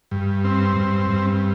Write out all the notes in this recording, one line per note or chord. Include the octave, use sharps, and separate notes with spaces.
G2
C4
G2
G2